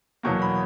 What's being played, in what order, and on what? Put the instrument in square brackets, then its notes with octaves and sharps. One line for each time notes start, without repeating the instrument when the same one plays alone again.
[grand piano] E2 B2 F#3 A#3 C#6
B5